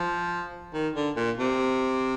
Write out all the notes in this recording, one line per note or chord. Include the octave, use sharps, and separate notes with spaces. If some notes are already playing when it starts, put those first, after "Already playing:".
Already playing: F3
D#3
D3
A#2
C3